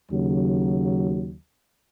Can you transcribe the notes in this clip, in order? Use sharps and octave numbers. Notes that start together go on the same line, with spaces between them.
D#2 C#3 F#3